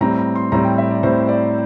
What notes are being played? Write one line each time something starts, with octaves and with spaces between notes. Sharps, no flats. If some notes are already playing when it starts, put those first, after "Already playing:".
A2 G3 C4 A#5
A#5
C6
A2 G3 C4 A#5
G5
E5
D5
A2 G3 C4 C5
D5